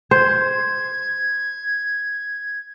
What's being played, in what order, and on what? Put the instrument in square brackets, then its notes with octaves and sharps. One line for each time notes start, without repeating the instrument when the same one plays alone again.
[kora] C5 [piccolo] G#6